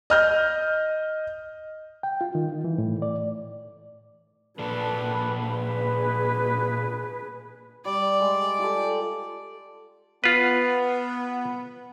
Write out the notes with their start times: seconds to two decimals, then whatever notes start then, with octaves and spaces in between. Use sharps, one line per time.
0.10 D#5 F6 G6
2.03 G5
2.21 F4
2.35 D#3
2.52 D#4
2.64 E3
2.78 A2
3.02 D5
4.59 A#2 D4 A4 B4
5.48 G#4 B4
7.85 G3 D5
8.20 G#3
8.59 F4 G4 A4
10.24 B3 F4 B4